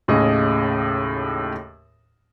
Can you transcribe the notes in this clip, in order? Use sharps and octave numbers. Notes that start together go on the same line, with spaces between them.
D#2 A2 C#3 G#4 D#5